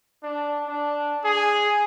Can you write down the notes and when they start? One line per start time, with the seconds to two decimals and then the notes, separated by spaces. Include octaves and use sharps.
0.23 D4
0.67 D4
1.24 G#4